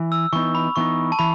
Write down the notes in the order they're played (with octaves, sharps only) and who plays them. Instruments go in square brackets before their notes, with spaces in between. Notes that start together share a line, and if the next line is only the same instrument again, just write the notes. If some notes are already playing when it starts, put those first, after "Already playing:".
Already playing: [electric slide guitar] E3
[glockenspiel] E6
[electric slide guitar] E3 [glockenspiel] C#6
[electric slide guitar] B3 D#4
[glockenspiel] B5
[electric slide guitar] E3 B3 D#4 [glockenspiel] C#6
[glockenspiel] A5
[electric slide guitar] E3 [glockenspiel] B5